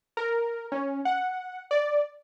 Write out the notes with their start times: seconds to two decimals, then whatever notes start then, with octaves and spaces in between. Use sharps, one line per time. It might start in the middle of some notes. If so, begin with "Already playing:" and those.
0.17 A#4
0.72 C#4
1.05 F#5
1.71 D5